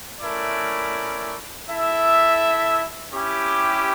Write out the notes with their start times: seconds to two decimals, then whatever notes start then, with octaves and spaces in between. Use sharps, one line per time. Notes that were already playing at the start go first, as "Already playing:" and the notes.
0.21 A3 C#4 E4 A#4 D5
1.67 E4 A4 E5
3.12 C#4 E4 G4